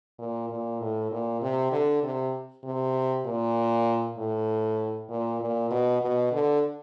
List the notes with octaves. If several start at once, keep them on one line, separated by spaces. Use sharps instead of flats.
A#2
A#2
A2
A#2
C3
D3
C3
C3
A#2
A2
A#2
A#2
B2
B2
D3